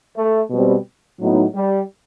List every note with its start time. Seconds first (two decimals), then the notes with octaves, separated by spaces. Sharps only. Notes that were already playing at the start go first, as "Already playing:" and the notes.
0.16 A3
0.51 B2 G3 C4
1.20 A2 F#3 B3 D#4
1.55 G3